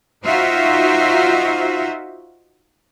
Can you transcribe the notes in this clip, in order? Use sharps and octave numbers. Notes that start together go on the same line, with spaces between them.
D#4 F4 F#4 C5 E5